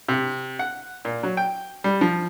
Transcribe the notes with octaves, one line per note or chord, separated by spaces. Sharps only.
C3
F#5
A#2
F#3
G5
G3
F3